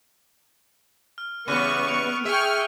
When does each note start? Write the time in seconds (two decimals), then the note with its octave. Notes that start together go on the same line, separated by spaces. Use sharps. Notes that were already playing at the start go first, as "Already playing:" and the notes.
1.18 F6
1.48 C#3 E3 G3 B3 C#6 F6 F#6 D#7
1.88 C#7 D7 F7
2.25 G#4 E5 G5 C#6 F6